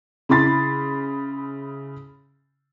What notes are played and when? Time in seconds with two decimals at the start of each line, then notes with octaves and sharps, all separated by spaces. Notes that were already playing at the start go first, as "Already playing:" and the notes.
0.29 C#3 E4 B5 C6 A6